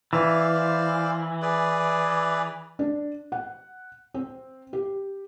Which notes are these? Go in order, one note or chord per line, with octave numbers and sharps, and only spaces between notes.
E3 C5 D5 F5
G#4 B4 D5
D4
F#5
C4
G4